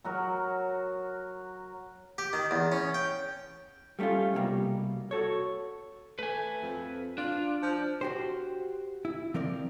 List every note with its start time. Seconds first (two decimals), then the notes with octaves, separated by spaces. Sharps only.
0.04 F#3 F#4 A#4
2.18 G4
2.33 D#3
2.51 E2
2.72 C#4
2.94 G5
3.99 G3 A3 B3 C#4 F4
4.34 C2 B2 D3 G3 A#3
5.11 F#4 A4 C#5
6.19 A3 B4 G#5
6.63 F2
7.18 D4 F4
7.62 F3
8.01 F#4 G4 C5
9.05 E4
9.34 F3 C4 A#4 D5